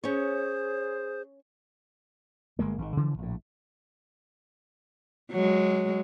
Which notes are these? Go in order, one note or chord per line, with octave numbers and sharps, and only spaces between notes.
C#4 G#4 C5 C#5
G1 G#3 A#3
G#1 D#3
C#3 E3 F3
A#1 A2
F#3 G#3